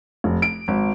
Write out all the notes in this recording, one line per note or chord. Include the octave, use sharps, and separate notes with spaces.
F1
D7
G#1